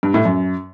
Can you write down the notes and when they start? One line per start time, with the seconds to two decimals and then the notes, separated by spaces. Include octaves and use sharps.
0.03 G2
0.14 A2
0.25 F#2